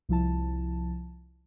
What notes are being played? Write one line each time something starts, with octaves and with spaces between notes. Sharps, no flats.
C2 F3 E4 A5